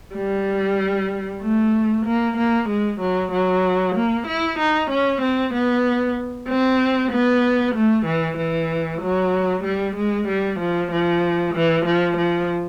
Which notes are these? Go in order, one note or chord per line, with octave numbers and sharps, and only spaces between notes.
G3
A3
A#3
A#3
G#3
F#3
F#3
A#3
E4
D#4
C#4
C4
B3
C4
B3
A3
E3
E3
F#3
G3
G#3
G3
F3
F3
E3
F3
F3